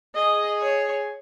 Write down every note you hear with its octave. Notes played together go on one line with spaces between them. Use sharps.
G#4 D#5
C#5